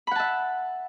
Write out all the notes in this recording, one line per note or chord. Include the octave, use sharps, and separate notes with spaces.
E5 F#5 A5 B5